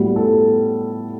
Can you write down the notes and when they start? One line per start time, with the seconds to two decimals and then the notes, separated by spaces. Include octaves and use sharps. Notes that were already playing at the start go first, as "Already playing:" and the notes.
Already playing: A2 G3 B3 F#4
0.16 A4